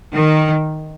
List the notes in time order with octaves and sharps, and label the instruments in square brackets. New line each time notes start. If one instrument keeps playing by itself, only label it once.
[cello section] D#3